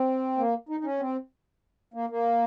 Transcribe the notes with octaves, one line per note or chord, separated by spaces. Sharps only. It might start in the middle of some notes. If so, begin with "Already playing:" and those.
Already playing: C4
A#3
D#4
D#4
C#4
C4
A#3
A#3